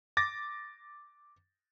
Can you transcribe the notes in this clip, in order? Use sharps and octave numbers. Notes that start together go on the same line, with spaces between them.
D6 A6 A#6